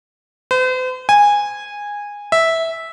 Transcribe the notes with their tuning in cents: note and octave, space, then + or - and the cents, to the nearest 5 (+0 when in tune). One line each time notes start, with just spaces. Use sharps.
C5 -45
G#5 -15
E5 -10